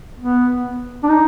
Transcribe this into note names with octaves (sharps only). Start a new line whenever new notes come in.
B3
D4
D#4